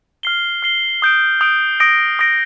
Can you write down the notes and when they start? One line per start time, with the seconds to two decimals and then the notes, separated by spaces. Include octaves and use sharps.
0.23 F6 C7 G7
0.62 F6 C7 G7
1.02 D#6 G6 D7
1.41 D#6 G6 D7
1.80 D#6 A#6 D7
2.19 D#6 A#6 D7